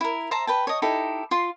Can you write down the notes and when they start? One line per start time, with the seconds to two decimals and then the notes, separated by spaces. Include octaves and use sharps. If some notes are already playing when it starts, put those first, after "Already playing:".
0.01 E4 A#4
0.31 C5 E5 A5 A#5
0.47 B4 G5 A5
0.67 C#5 D#5
0.82 D#4 E4 G4 A4
1.31 F4 C6